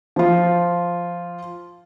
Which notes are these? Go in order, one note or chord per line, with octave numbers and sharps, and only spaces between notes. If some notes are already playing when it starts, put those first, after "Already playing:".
F3 F4